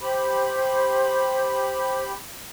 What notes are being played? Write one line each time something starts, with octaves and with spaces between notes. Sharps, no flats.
G4 C5 B5